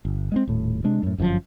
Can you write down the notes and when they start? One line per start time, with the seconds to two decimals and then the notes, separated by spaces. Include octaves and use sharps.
0.05 G1
0.32 G#3 B3 C4
0.47 D#1 A2
0.84 C3 G#3 D4
1.03 F#2 A2
1.18 G1 F#2 D#3 F3